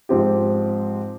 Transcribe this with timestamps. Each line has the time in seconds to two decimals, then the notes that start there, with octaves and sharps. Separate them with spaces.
0.09 G#2 F3 C4 G4